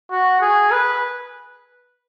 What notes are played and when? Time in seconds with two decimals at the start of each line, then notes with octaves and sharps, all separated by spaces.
0.11 F#4
0.41 G#4
0.71 B4